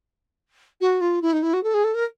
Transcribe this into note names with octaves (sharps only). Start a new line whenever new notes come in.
F#4
F4
E4
D#4
E4
F#4
A4
G#4
A4
A#4